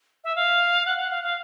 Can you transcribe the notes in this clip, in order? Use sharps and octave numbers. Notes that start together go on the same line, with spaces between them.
E5
F5
F#5
F#5
F5
F5